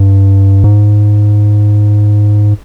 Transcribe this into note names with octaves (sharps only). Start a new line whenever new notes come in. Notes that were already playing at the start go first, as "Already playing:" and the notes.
Already playing: G2
G#2